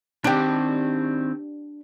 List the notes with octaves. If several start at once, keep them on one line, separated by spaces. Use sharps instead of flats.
D#3 C4 D4 G4